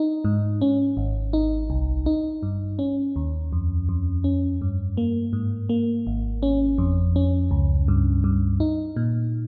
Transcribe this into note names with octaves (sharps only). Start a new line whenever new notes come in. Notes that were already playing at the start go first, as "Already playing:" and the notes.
Already playing: D#4
G#2
C#4
G#1
D#4
C2
D#4
G2
C#4
D#2
F2
F2
C#4
G2
A#3
G#2
A#3
G#1
C#4
F2
C#4
C#2
G2
G2
D#4
A#2